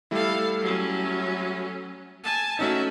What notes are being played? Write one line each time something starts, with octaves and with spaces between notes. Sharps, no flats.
G3 A3 E4 A4 F5
F#3 C#4
G#5 A5
A3 C#4 D#4 F#4 E5